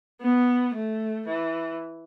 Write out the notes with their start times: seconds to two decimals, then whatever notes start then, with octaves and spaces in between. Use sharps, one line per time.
0.21 B3
0.74 A3
1.26 E3